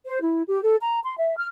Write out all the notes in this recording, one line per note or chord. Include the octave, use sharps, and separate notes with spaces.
C5
E4
G4
A4
A#5
C6
E5
F6